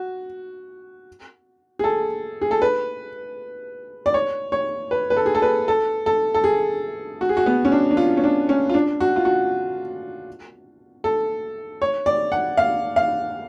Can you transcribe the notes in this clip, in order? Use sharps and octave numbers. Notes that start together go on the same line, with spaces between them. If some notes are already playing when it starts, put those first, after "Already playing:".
Already playing: F#4
G#4
A4
G#4
A4
B4
D5
C#5
C#5
B4
B4
A4
G#4
A4
B4
A4
A4
A4
G#4
F#4
G#4
F#4
B3
C#4
D4
D4
F4
C#4
D4
C#4
F4
D4
F#4
F4
F#4
A4
C#5
D5
F#5
F5
F5